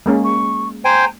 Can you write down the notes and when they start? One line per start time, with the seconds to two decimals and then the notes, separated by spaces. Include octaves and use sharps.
0.06 G#3 A#3 C#4
0.24 C#6
0.85 C5 G5 G#5 A#5